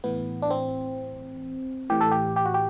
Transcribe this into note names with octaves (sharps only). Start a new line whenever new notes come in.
A2 E3 B3
D4
C4
A2 E3 G4
A4
G4
G4
F#4
G4